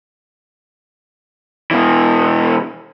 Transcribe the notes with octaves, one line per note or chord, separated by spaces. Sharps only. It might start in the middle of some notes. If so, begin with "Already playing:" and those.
B2 E3